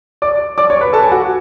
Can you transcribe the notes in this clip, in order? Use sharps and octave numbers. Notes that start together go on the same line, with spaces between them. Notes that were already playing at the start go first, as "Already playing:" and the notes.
D5 D6
D5 D6
C#5 C#6
B4 B5
A4 A5
G#5
F#4 F#5